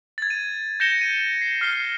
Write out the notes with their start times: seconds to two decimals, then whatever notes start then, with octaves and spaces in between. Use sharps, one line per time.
0.18 G#6 A6
0.30 D#7
0.80 G6 A#6 C#7 E7 G7
1.01 D#7
1.41 C7
1.61 F6 C7 G7